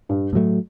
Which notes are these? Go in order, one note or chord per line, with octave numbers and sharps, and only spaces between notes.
G2
A2 F#3 A3